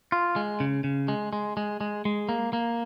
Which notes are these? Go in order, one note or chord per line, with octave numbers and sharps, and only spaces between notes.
F4
G#3
C#3
C#3
G#3
G#3
G#3
G#3
G#3
A#3
A#3